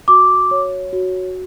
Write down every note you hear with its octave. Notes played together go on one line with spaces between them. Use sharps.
F#4 D6
C#5
F#4